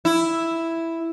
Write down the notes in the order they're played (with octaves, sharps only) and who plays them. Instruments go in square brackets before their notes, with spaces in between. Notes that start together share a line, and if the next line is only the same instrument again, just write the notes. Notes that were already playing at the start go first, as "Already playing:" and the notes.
[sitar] E4